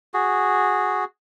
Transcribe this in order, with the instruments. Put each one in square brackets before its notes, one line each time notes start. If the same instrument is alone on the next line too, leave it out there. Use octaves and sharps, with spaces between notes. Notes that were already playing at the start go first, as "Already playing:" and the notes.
[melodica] F#4 G#4